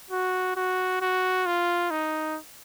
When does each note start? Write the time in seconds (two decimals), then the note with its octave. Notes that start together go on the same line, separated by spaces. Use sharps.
0.11 F#4
0.56 F#4
1.01 F#4
1.46 F4
1.91 D#4